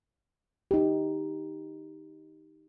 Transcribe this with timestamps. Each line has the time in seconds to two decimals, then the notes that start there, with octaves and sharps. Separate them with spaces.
0.71 D#4 G4